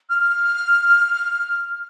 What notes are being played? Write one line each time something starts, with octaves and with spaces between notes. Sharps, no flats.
F6